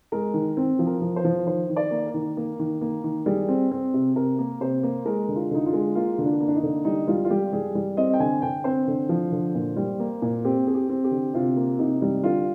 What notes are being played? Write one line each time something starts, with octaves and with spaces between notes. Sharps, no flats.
G#3 A#4
D#3
C4
F3
A#4
F3
C5
F3
D#3 C5
D#3
D5
A#3
A#4
D#3
A#3
D#3
A#3
D#3
G3 G#4
C4
C4
C3
C3 A#4
A#3
C3 C5
A#3
G#3 A#4
D3
F4
D3 D#4
F4
G#3
A#3 F4
D3
D4
A#3
D4
D#4
D3
G3 D#4
G3 F4
F4
G3 G4
G3 G#4
G3
C4 D#5
G5
D3 G#5
D3 G5
C4 C5
D3
F3
D3
A#2
G3
A#3
A#2
C4 G4
C4 G#4
G4
C4
G4
D3
C3 F4
A#3
C3 D#4
G3
D3 F4